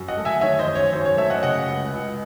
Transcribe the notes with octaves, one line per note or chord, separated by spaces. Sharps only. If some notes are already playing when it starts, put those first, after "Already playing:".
Already playing: F#2
D#5 F#5
A3
E5 G#5
D#3 C#5 E5
C5 D#5
F#2
C#5
F#2 C5
C#5
A3 C#5 E5
D#5 F#5
C#3 D#5 F#5
C#2
C#2